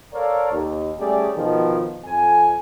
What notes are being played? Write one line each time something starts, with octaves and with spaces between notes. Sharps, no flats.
A4 A#4 C#5 D5 F5
D#2
G3 A3 C#4 G4 G#4 D5
B2 D#3 F3
F2 G#5